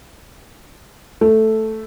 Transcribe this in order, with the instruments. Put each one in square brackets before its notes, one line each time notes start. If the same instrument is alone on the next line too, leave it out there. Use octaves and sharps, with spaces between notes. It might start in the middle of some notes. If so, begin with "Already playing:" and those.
[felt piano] A3